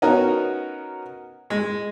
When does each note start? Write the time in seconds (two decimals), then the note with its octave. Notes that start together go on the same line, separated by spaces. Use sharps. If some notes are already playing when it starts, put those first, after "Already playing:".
0.02 B3 C#4 D#4 F#4 A#4
1.50 G#3